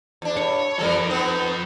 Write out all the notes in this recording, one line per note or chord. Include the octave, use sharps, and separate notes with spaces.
E2 D4
G2 C#5
E3 F3 G3 A4 A#4
B3 C4 D#4